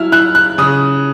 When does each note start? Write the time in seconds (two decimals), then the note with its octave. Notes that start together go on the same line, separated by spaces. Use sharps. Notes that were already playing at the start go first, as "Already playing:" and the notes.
Already playing: F#3 E4 E6 F6
0.12 E4 F#6
0.35 F#6
0.58 C#3 D#6